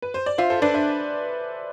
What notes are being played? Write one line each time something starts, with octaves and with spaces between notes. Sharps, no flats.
B4
C5
D5
F4 C5 E5
A4 C5
D4 B4 D5
C5 E5